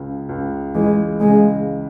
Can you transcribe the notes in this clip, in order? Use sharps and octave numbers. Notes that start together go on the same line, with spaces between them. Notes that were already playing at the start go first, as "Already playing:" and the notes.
Already playing: C#2 C#3
C#2
E3 G#3
C#3 G#3